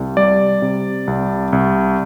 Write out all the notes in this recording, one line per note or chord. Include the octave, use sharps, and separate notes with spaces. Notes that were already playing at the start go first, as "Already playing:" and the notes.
Already playing: C2
G3 D5
C3
C2
C2